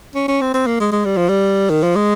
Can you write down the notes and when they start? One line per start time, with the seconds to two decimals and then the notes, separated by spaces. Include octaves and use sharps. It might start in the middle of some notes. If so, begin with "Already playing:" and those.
0.15 C#4
0.28 C#4
0.41 C4
0.54 C4
0.67 A#3
0.80 G#3
0.92 G#3
1.05 G3
1.17 F3
1.29 G3
1.70 D#3
1.83 F3
1.96 G#3